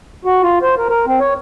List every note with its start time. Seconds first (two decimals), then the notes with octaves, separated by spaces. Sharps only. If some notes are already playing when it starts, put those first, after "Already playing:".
0.25 F#4
0.43 F4
0.62 C5
0.78 A#4
0.89 A#4
1.07 C4
1.20 C#5